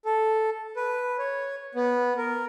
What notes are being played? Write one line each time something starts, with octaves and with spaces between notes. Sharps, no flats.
A4
B4
C#5
B3
A#4